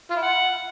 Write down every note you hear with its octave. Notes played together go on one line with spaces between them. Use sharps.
F4
E4
F#5